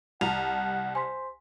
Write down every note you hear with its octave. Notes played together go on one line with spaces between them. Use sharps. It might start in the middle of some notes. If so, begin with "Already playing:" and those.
C2 F#5 A5 A#5 F7
C5 G#5 C6 B6